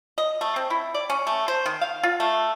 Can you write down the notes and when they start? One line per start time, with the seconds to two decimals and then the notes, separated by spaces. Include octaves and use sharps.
0.18 D#5
0.41 A3
0.56 C4
0.70 E4
0.94 D5
1.10 C#4
1.27 A3
1.48 C5
1.66 D#3
1.81 F5
2.03 F4
2.20 A3